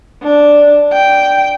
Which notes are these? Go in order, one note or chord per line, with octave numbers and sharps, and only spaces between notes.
D4
G5